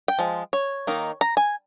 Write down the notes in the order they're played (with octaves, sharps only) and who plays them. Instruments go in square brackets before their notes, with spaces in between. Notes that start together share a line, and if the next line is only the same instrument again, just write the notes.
[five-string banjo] G5
F3 G#3
C#5
D#3 A#3 D#4
A#5
G#5